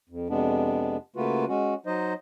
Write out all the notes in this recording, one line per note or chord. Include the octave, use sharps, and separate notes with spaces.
F2
F2 C3 G#3 B3 D4
C#3 A3 A#3 F4 F#4 B4
G#3 C#4 F#4
F#3 D#4 C5 D#5